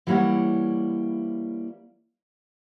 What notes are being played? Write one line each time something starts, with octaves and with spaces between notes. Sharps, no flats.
E3 G3 A#3 E4 C#5 F#5